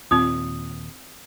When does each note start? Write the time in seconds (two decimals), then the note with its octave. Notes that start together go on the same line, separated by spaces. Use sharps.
0.11 D#2 A#2 C4 F4 D#6